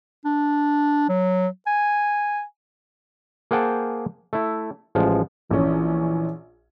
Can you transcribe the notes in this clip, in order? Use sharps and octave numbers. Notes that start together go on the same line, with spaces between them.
D4
F#3
G#5
A#3 G#4 C5 F#5 G5 A5
A3 E4
A1 F3 G#3
A#1 E3 C#4